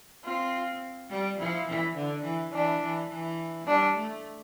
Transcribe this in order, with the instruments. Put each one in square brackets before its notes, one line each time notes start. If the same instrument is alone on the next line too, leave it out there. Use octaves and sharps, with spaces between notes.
[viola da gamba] C4 [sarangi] F4
[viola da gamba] G3
[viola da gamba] F3 [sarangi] E4
[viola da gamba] E3
D3
E3
[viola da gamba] E3 [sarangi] D4
[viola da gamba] E3
E3
[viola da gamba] G3 [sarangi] D4
[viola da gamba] A3